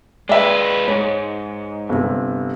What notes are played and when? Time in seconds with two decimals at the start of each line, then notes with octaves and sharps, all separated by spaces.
0.29 G#3 B4 D5 E5 G5
0.88 G#2 C#5
1.89 G1 C3